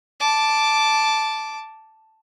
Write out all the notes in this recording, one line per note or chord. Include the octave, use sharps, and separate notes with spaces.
A5 D6